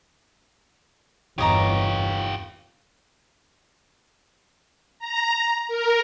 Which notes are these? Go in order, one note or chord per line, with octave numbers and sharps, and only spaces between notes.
G1 E2 F4 G4 C#5 D#5 A#5
A#5
A#4